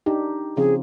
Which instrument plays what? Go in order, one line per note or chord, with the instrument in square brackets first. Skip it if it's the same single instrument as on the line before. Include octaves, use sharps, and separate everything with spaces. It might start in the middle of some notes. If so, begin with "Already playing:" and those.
[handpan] D4 D#4 G4
[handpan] C#3 F3 C4 [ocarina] G#4